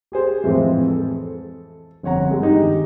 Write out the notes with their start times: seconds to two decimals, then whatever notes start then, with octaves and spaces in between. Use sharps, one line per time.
0.12 G4 G#4 C5
0.43 F2 A2 E3 F3 G#3 C4
0.87 A4
2.03 G1 F2 C#5 F#5 A#5
2.30 G2 G#3
2.42 D#3 D#4 G4